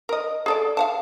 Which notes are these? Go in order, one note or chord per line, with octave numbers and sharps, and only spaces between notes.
A#4 D#5
G#4 A4 D5
F5 F#5 A5